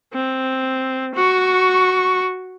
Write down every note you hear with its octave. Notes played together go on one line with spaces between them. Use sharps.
C4
F#4 C#6